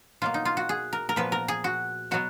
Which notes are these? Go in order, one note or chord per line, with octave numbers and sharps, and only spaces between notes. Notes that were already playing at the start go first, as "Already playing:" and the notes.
B2 F#3 A#3 F4
D#4
F4
F#4
G#4
A#4
A#4
A#2 F3 B3 B4
A#4
G#4
F#4
B2 F#3 B3 F#4